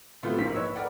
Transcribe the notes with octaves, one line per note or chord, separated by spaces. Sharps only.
A2 C3 F#3 A3 B3 F4
A#1 G#2 A#3 B6
B4 C#5 D#5 E6
A#4 B4 D5 F#5 G5